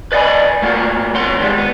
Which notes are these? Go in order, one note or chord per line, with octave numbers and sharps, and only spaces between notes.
B4 D5 D#5 F5 G#5 B5
A3 A#3 F4 F#4
F2 B2 C#5 F#5 C6
D#3 G3 G#3 F4
B3